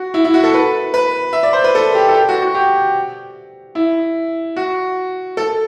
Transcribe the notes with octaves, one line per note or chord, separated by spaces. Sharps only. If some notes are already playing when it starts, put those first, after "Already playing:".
Already playing: F#4
E4
E4
F#4
A4
B4
B4
E5
D5
C5
B4
A4
G4
A4
G4
F#4
F#4
G4
E4
F#4
A4